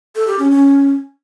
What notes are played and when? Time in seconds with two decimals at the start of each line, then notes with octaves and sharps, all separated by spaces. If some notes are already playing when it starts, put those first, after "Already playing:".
0.16 A4
0.27 G4
0.39 C#4
0.51 C#4